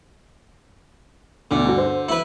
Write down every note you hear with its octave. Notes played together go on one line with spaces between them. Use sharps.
D2 B2 D3
G2 F#4
C5
E4 B4